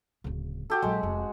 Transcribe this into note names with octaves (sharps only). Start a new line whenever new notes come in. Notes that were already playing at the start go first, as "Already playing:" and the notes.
D1 C#3
F#4 G4 A4
A#1 F#3 G#3
F1